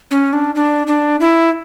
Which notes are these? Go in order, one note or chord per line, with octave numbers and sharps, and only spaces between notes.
C#4
D4
D4
D4
E4